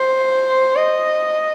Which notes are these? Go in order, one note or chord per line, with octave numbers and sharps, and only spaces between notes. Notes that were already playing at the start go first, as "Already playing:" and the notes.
Already playing: C5
D#5